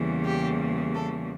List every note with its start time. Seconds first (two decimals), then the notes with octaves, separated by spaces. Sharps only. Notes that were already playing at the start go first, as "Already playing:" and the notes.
Already playing: E2 C#3 E3 G3 A#3
0.24 G4
0.95 A4